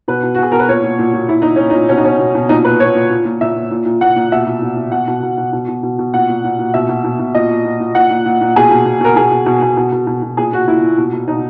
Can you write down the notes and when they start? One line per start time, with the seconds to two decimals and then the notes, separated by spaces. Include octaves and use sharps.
0.08 B2 B4
0.23 B2
0.34 F#4
0.38 B2 G#4
0.52 B2 A#4
0.59 B4
0.68 A#2 C#5
0.83 A#2
0.99 A#2
1.13 A#2
1.29 A#2 E4
1.42 A#2 D#4
1.56 A#2 C#4
1.70 D#4
1.75 A#2
1.89 B2 C#4
1.97 D#4
2.04 B2 C#4
2.19 B2
2.35 B2
2.49 A#2 D#4
2.64 A#2 B4
2.80 A#2 C#5
2.95 A#2
3.10 A#2
3.25 A#2
3.41 A#2 E5
3.56 A#2
3.71 A#2
3.86 A#2
4.01 A#2 F#5
4.16 A#2
4.32 B2 E5
4.47 B2
4.62 B2
4.76 B2
4.92 B2 F#5
5.08 B2
5.23 B2
5.37 B2
5.53 B2
5.68 B2
5.83 B2
5.99 B2
6.14 A#2 F#5
6.29 A#2
6.44 A#2
6.59 A#2
6.74 B2 E5
6.89 B2
7.04 B2
7.19 B2
7.34 A#2 D#5
7.50 A#2
7.65 A#2
7.80 A#2
7.95 A#2 F#5
8.10 A#2
8.26 A#2
8.41 A#2
8.56 B2 G#4
8.71 B2
8.85 B2
9.00 B2 A#4
9.16 B2 G#4
9.31 B2
9.46 B2
9.62 B2
9.77 B2
9.92 B2
10.07 B2
10.22 B2
10.37 A#2 G#4
10.52 A#2 F#4
10.67 A#2 E4
10.82 A#2
10.98 B2
11.13 B2
11.28 B2 D#4